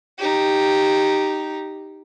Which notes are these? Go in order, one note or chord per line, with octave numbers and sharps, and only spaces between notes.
D#4 G4